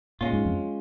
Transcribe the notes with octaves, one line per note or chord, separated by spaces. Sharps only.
A#2 G#3 C#4 F4
G#2
F2